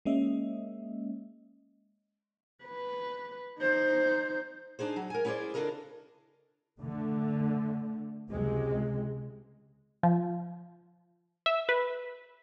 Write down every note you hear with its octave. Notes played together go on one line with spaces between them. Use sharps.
G#3 A#3 C#4 D#5 E5
B4
D#4 C5
D4 D#4 G#4 C5
F#3
A#4 G#5
C#4 E4 G#4 C5 D5
C#3 D4 F4 A4 A#4 D#5
D3 A3
C#2 C3 G#3
F3
E5
B4